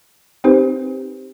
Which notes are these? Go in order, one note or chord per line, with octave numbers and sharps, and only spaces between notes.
C4 D#4 G4 B4 C5